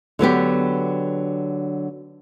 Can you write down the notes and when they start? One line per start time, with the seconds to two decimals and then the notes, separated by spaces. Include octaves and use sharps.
0.19 D3 F#3 B3 G4